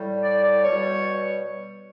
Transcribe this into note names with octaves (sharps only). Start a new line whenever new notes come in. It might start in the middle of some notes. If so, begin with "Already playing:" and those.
Already playing: A2 G3
D5
D5
B2 G3 C#5